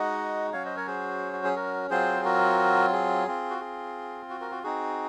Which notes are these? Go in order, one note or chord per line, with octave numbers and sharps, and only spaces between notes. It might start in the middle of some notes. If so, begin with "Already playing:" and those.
Already playing: G#3 D#4 F#4 D#5 F#5
F#3 C#4 F#4 C#5 F5
C5 D#5
A#4 C#5
G#4 C5
F#4
G#4
F#4 A#4
F#3 C4 F4 G#4 C5
G#4
F#4 A#4
G#4
C4 F4
F#4
G#4
F#4
F#4 A#4
F#4
C4 D#4 F#4 G#4